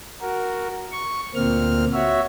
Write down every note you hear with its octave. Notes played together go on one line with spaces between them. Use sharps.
F#4 A#4
C#6
D2 A#2 A#3 C4 F6
F#4 C#5 E5